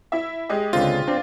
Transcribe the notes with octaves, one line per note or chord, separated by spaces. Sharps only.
E4 E5
G#3 G4 D#5
C#2 D3 C4 F4
C4 D4